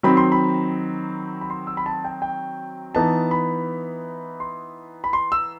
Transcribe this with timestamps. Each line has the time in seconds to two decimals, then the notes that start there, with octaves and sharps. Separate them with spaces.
0.03 D#3 F#3 C4 D#4 B5
0.17 C6
0.32 B5
1.41 B5
1.50 C6
1.67 E6
1.77 B5
1.86 A5
2.04 G5
2.22 G5
2.95 E3 B3 D#4 A5
3.31 B5
4.40 C6
5.04 B5
5.13 C6
5.32 E6